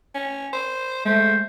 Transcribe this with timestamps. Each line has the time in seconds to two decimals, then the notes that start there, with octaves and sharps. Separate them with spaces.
0.14 C#4
0.53 C5
1.05 G#3 A3 C5